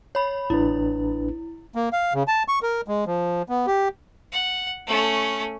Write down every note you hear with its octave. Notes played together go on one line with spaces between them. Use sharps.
C#5 B5
A1 D4 E4 B4
A#3
F5
C#3
A5
C#6
A#4
G#3
F3
B3
G4
F#5
A3 C#4